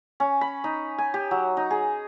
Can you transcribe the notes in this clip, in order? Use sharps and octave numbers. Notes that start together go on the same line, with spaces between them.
C#4
B5
D#4
G#5
G4
F#3
D#4
G#4